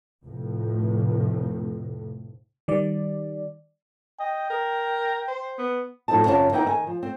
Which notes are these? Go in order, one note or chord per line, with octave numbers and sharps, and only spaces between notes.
F1 F2 A2
D#3 G3 D5
D#5 G5
A#4
C5
B3
A2 F3 C4 D#4 F#4 A5
F#2 C#3 F4 F#4 C#5 A5
A#3 B3 D#4 E4 B4 G5
D#3 E5 G#5
F3
C4